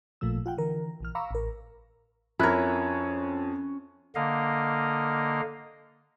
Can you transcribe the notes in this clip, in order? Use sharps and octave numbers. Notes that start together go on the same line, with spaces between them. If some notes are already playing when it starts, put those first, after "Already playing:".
A1 A#2 F3 A3 E6
F4 F#5 G5
D3 E3 A#4
A#1 E3 F6
F5 A#5 B5 C#6 D6 E6
A1 A#4
F2 C#4 E4 A#4 C#5 F#6
D3 A#3 D#5 F5